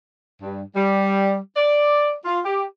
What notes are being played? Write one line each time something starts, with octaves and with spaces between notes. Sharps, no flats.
G2
G3
D5
F4
G4